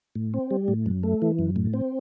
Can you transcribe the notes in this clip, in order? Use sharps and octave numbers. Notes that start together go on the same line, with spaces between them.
A2
C4
G3
A2
F#2
A3
E3
F#2
A2
C4